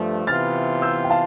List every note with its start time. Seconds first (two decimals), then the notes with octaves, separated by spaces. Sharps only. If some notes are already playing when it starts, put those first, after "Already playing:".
Already playing: G2 F3 A3
0.27 C3 E3 B3 F4 F6 A6
0.82 E6 G6
1.04 G5
1.10 F5 A5